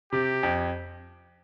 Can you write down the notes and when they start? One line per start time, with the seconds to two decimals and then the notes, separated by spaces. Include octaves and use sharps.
0.12 C3 G4
0.43 F2